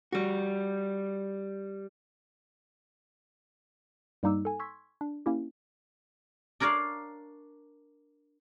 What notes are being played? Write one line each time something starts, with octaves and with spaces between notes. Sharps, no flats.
G3 F#4
G2 G3 A#3 D#4 D6 E6
A4 G#5
C6 C#6 E6 G#6 B6
D4
A#3 C#4 E4 G4
D4 A#4 C#5 D5 F5